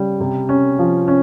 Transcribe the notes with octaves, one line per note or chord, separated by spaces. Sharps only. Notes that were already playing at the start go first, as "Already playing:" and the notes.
Already playing: C#3 G3
C3
C#4
F3
C#4